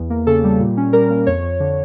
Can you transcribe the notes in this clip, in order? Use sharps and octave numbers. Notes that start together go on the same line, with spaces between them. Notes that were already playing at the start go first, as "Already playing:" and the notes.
Already playing: E2
A#3
C#3 A4
G3
A#2
C#4
G3 A#4
A#3
F2 C#5
F2
D3